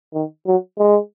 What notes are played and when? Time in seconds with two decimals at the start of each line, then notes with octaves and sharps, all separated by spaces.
0.14 D#3
0.46 F#3
0.78 G#3